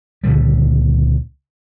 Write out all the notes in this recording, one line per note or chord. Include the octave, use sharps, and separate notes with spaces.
C#2 A#2 D3 G3